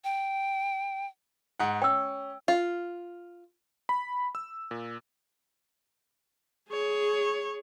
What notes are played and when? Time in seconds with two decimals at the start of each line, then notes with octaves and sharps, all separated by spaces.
0.04 G5
1.59 G#2 F#5
1.82 C#4 G5 E6
2.48 F4
3.89 B5
4.35 E6
4.71 A#2
6.69 G#4 C#5